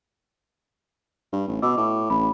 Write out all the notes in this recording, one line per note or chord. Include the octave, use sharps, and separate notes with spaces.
G2
A1
B2 D#5 D6 E6
A2 D6
A1 B5